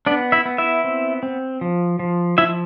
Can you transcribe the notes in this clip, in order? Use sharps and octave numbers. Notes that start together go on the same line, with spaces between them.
B3 D4 D5
E4 E5
B3
E4 E5
C4
C4
F3
F3
F3 E4 E5